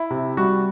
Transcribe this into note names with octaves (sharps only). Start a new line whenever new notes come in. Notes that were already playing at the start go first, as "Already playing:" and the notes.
Already playing: E4
C3
G3 F#4